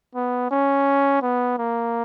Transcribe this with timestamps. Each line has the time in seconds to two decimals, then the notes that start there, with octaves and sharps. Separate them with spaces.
0.15 B3
0.51 C#4
1.22 B3
1.58 A#3